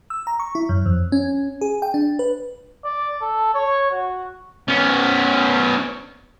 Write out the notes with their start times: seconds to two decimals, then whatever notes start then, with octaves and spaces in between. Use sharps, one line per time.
0.10 E6
0.27 A#5
0.40 C#6
0.55 E4
0.69 F#2
0.86 F2
1.12 C#4
1.61 G#4
1.82 G5
1.94 D4
2.19 B4
2.84 D5
3.21 A4
3.54 C#5
3.91 F#4
4.68 B3 C#4